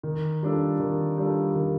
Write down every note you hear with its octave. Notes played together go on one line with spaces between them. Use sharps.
D#3
G3 D4 F4 A4
D#3
G3 D4 F4 A4
D#3